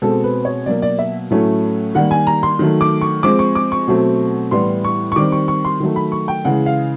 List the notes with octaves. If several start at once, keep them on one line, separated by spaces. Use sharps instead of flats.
B2 G#3 C4 A4
B4
C#5
B2 F#3 A#3 D5
D5
E5
A2 F#3 A3 C#4
D#3 G3 A#3 F#5
G#5
A#5
C6
D#3 F#3 A3
D6
C#6
F3 G#3 C4 D6
C#6
D6
C#6
B2 F#3 A3 C4
A2 E3 G3 B3 C6
C#6
C#6
D#3 G3 C4 D6
C#6
C#6
C6
D#3 F#3 A3
B5
C#6
G5
C#3 E3 G#3 F#5
F5